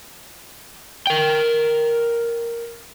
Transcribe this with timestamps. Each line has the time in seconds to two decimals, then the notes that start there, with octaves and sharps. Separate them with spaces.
1.07 A#4 G5